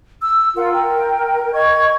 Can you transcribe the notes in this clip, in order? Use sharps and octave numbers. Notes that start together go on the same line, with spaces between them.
E6
F4 A#4 F#5
A#4 G5
D#5 C#6 G#6